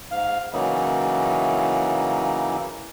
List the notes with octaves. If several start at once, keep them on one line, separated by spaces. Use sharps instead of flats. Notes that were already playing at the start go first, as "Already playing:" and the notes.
G#2 F5
C#3 E3 F#3 A#3 D#4 E4